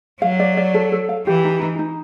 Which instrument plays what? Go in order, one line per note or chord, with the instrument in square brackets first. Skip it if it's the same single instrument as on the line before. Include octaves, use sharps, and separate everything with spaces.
[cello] F#3 [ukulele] F5
[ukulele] D5
D5
A4
A4
F5
[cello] E3 [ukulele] G4
[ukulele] D#4
D#4
D#4